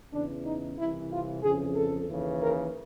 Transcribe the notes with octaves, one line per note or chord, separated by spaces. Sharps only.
E2 C#3 E3 D4
D#4
C2 C3 E3 E4
F4
F2 C#3 E3 G#4
A4
D#2 C#3 E3
A#4